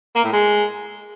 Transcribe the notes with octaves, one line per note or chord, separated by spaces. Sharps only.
A#3
A2
G#3